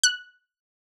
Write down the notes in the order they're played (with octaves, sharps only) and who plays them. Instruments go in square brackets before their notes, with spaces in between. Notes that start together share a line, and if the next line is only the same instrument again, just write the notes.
[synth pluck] F#6